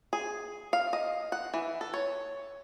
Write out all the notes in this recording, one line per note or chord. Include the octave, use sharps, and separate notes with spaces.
G#4
F5
D#5
F#5
E3
A4
C#5